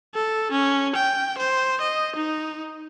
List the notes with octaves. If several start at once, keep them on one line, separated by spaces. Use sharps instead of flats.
A4
C#4
G5
C5
D#5
D#4